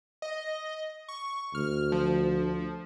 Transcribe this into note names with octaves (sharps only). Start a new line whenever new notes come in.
D#5
C#6
D2 F6
F3